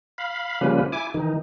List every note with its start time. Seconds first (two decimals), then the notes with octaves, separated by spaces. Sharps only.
0.18 F5 B5
0.61 C#3 F3 G3 A#3 C#4 B4
0.92 E4 G#5 D6
1.14 D#3 E3 D#4